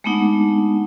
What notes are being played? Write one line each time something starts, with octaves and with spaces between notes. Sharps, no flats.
G#3 A3 B3 D4 D#4 F#5